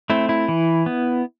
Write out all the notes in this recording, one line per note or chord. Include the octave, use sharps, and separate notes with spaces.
A3 C4 E4
E4
E3
B3